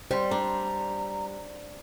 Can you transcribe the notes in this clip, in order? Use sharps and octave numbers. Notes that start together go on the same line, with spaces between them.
G3 C5
D4 A#5